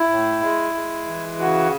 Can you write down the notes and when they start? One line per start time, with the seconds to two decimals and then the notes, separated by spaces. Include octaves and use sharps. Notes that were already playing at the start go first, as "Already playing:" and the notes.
Already playing: E4
0.09 A2
0.41 G#3
0.74 G#3
1.07 E3
1.39 C#3 F#4